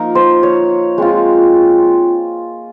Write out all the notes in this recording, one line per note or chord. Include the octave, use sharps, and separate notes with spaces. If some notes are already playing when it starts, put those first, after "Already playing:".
Already playing: F3 A#3 D#4 A#4
C5
C#5
G#3 C4 F4